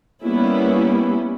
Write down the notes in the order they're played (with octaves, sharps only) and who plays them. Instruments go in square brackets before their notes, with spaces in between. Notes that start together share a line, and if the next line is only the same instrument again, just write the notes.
[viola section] G3 A#3 B3 C#4 E4